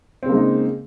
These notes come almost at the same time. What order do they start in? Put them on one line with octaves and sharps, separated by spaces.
C4 C#3 A#3 G#3 D#4